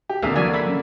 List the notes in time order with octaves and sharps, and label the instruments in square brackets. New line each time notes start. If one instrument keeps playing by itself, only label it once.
[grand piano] G4
[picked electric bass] D1 C4 [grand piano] D3 A#3 [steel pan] G#4 E5 F5
[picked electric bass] E3 F#3 [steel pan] F#4 D5 G#5
[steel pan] E5 B5
[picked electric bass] F#3 C#4